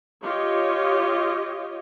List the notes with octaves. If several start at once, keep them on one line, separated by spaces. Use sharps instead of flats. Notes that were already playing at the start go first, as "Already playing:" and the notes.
F4 G4 C#5 D#5